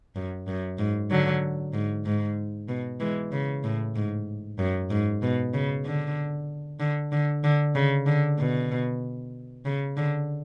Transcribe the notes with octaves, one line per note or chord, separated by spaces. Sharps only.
F#2
F#2
G#2
D3 F#3
G#2
G#2
B2
E3 G#3
C#3
A2
G#2
F#2
G#2
B2
C#3
D3
D3
D3
D3
C#3
D3
B2
C#3
D3